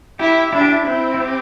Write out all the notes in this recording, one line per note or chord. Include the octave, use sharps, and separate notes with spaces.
E4 G4
D4 E4
G4
E4
C4 E4
E4
G4